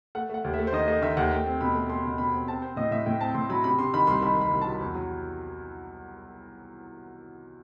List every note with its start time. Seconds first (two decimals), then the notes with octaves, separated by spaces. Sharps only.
0.15 A3 F#5
0.30 A3 F#5
0.44 D#2
0.54 E5
0.59 A3
0.67 C5
0.73 D#3 D#5
0.88 A3 D#5
1.02 D#3 E5
1.17 D#2 F#5
1.31 A3 G5
1.46 C4
1.61 B2 B5
1.75 A3
1.89 A3 C6
2.05 B2
2.18 B2 B5
2.34 C4
2.48 C4 A5
2.62 C4 C5
2.76 A2 D#5
2.91 A2 E5
3.06 A2 G5
3.21 C4 A5
3.34 A2 C6
3.50 F#3 B5
3.64 C3 B5
3.79 C3 C6
3.93 D#3 B5
4.07 C2 C6
4.22 D#3 B5
4.37 C2 B5
4.51 C2
4.61 F#3 A5
4.80 E2
4.95 F#3